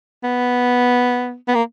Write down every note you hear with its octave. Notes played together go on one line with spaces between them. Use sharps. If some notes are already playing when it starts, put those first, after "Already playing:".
B3
B3
A#3